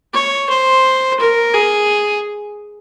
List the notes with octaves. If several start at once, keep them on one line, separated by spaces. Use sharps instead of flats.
C#5
C5
A#4
G#4